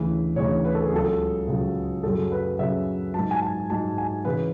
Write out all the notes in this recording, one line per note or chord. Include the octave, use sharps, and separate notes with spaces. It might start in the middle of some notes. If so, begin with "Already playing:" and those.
Already playing: D2 C#3 E3
D2 C#3 E3 C#5
B4
A4
G#4
C#2 C#3 F#3 A4
C#2 C#3 F#3
F#2 C#3 F#3 A4
B4
F#2 C#3 F#3 E5
G#2 F#3 A5
G#5
A5
G#2 F#3 A5
G#5
C#3 E3 B4